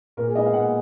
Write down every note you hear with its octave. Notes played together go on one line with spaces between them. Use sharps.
A#2 A#4
G#4
G#3 B3 D#4 D#5
F5
A#2 F#5